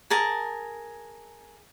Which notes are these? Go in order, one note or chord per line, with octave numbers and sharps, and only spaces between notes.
G#4 A#4 A5